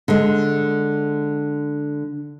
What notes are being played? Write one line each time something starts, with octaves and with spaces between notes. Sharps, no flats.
D3 G#3